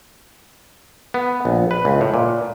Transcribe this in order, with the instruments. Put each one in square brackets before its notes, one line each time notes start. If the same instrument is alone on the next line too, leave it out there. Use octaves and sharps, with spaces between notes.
[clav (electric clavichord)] B3
A#1
B4
C#2
A2
A#2